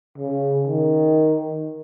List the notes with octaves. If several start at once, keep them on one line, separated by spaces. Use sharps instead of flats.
C#3
D#3